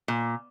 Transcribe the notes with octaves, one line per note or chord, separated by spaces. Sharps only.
A#2